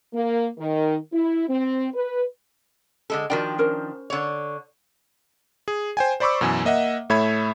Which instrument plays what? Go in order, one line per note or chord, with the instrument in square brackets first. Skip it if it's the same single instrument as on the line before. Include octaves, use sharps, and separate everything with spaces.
[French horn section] A#3
D#3
E4
C4
B4
[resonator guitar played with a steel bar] D3 G#3 A4
[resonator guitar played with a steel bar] D#3 F3 D4 [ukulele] F#4 A#4 G5
[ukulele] C#4 A#4 C5
[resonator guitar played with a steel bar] D3 C#5
[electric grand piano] G#4
C5 G5 G#5
C5 D5 B5 C#6 D6 E6
F#2 B2 E3 G#5 E6
A#3 D#5 E5 F#5
A2 A3 C#5 E5 B5 G#6